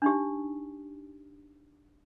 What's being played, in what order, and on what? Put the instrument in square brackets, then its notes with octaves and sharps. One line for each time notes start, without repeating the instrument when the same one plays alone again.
[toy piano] D4 D#4 G4